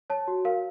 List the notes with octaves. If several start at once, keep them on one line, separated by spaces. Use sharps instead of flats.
C#5 A5
F#4
A#4 F5